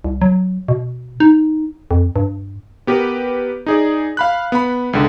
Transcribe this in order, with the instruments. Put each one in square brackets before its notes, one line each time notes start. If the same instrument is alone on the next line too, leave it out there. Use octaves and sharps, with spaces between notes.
[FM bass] C2
F#3
B2
D#4
F2
G2
[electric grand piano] B3 G4 A#4 B4
D#4 G#4 D5
F5 B5 F#6
B3 B5
C#2 D3